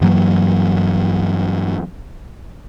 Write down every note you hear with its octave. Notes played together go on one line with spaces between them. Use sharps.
G2 E3 F#3 A#3